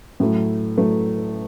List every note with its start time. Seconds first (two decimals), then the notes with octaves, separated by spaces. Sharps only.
0.20 A2 F#3 A3
0.78 A2 F#3 A3